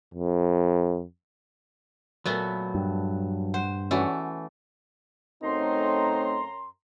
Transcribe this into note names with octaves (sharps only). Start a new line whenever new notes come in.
F2
A#2 F#3 A3 B3
G2
C5 F#5
E3 A3 C#4 F#4 D5
F#2 A3 C4 D#4 C#5 A#5 C6